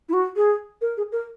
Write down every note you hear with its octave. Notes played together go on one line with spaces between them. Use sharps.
E4
F#4
G#4
A#4
G#4
A#4